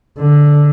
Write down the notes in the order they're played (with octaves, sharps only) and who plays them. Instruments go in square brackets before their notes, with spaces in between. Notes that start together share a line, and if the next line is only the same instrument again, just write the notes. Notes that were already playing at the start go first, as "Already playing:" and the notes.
[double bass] D3